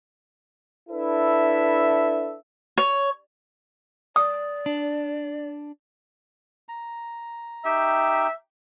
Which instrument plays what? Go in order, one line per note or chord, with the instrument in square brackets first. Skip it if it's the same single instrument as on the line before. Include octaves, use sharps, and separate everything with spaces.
[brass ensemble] D4 E4 A4 B4 E5
[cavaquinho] C#5
[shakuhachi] D5 [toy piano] D#6
[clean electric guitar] D4
[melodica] A#5
[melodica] D#4 G4 G5 [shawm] E5